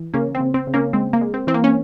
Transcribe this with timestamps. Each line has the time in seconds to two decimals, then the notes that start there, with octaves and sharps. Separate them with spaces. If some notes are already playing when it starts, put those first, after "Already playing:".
Already playing: E3
0.14 C#3 A#3 C#4
0.35 C4
0.40 C#3
0.54 C4
0.67 C#3
0.74 A#3 C#4
0.93 G#3 C4
1.13 A#3
1.21 G#3
1.34 C4
1.47 E3 C4
1.54 A#3
1.64 C#4